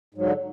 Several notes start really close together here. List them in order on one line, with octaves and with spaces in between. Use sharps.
G#2 F#3 D3